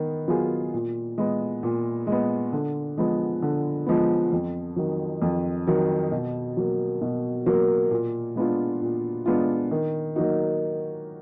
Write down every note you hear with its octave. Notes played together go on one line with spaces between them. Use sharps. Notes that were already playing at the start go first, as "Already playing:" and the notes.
Already playing: D#3 B3
F#3 B3 F4 G#4
A#2
G#3 B3
A#2
G#3
B3
D3
F3 G#3 B3
D3
F3 G#3 B3
F2
D#3 F#3
F2
D#3 F#3
B2
F#3 A#3
B2
F#3 A#3
A#2
G#3 B3 D4 F4
A#2
G#3 B3 D4 F4
D#3
F#3 A#3 D#4 F#4